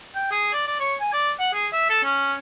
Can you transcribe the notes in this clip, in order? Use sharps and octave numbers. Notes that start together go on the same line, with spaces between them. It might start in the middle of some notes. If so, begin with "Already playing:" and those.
G5
G#4
D5
D5
C#5
G#5
D5
F#5
G#4
E5
A4
C#4